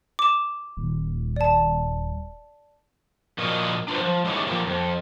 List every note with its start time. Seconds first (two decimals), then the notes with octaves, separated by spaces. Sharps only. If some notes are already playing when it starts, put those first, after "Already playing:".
0.19 D6 E7
0.77 D#1
1.36 D5 A5
3.38 A#2 F3 F#4 A#4 D#5
3.88 D4 F4 B4 C5
4.01 F3
4.25 G#3 A3 C#4 D#4 E4 G4
4.47 F3 A#3 G4
4.67 F2